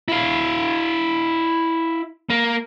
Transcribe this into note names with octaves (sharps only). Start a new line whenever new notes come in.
E4 F5
A#3 A#4